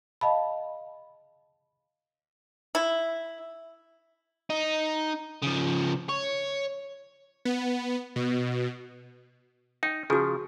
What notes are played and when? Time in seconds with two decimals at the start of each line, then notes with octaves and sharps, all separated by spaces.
0.21 D#5 F5 A5 B5
2.75 E4
4.50 D#4
5.42 C#3 F3
6.09 C#5
7.45 B3
8.16 B2
9.83 D#4 G5
10.10 C#3 F3 F#4 G#4